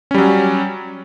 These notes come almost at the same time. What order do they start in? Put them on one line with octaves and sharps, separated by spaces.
C#4 G3 F#3